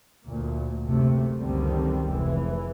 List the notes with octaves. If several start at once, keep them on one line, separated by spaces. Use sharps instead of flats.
D2 A#2
F#1 C3 A3
C#2 F#2 D3 D#3 G3 C4
F1 E3 G#3